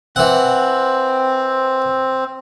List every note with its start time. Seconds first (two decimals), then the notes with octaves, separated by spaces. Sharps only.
0.16 E3 C4 F#5